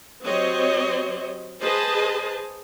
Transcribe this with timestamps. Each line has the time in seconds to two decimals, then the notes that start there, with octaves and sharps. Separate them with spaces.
0.24 F#3 C4 G4 C5 C#5 D#5
1.60 G#4 B4 C5 D#5 A5